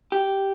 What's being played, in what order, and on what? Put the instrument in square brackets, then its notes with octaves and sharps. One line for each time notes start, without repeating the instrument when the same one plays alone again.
[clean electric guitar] G4